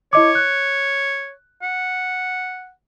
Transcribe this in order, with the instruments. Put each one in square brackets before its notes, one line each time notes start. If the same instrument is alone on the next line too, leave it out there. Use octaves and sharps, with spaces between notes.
[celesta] E4 D#5 D6 [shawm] C#5
[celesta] F#6
[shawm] F#5